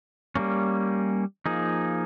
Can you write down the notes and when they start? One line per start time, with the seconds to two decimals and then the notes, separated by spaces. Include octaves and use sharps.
0.36 G3 A#3 C#4
1.46 F3 A#3 D#4 G#4